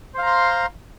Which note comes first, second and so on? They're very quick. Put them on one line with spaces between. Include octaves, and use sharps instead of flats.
C5 F5 A#5 C6